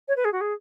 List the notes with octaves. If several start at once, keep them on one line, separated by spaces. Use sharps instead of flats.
C#5
B4
G#4
F#4
G#4